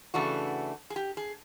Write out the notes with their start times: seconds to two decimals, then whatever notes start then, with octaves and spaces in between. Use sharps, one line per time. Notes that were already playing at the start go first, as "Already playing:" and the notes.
0.14 C#3 E3 A3 D4 F#4
0.90 G#4
0.96 G4
1.17 G#4